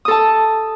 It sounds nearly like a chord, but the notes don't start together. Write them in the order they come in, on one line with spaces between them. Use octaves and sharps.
D#6 A4 A5